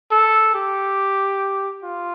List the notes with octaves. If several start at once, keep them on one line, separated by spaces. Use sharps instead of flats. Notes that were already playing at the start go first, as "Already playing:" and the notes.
A4
G4
F4